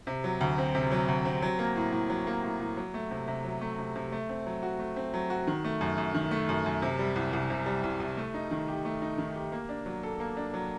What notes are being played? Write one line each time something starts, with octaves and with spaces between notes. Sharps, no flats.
C3
F#3
D2
C4
C3
F#3
D2
C4
F#3
A#3
A2
A2
F#3
A#3
A2
A2
F#3
A3
C3
C3
F#3
A3
C3
C3
A3
C4
F#3
F#4
A3
C4
F#3
F#4
D#3
A3
F#2
F#2
D#3
A3
F#2
F#2
C3
G3
C2
C2
C3
G3
C2
C2
A3
D#4
D#3
G4
A3
D#4
D#3
G4
A#3
D4
F#3
A4
A#3
D4
F#3